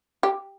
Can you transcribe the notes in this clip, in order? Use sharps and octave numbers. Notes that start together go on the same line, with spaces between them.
G4